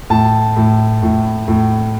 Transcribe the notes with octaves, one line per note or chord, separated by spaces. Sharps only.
A2 A5
A2
A2
A2